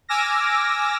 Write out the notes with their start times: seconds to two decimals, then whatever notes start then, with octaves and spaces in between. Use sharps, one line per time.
0.09 G#5 D6 E6 F6 A#6